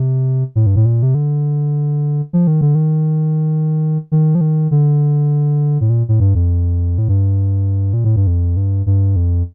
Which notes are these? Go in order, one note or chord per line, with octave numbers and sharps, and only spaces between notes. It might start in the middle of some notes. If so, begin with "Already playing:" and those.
Already playing: C3
A2
G2
A2
A#2
C3
D3
F3
D#3
D3
D#3
D#3
F3
D#3
D3
A2
A#2
A2
G2
F2
A2
G2
A#2
A2
G2
F2
G2
G2
F2